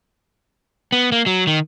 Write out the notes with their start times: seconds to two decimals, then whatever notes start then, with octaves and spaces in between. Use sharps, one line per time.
0.92 B3
1.12 A#3
1.26 F#3
1.47 D#3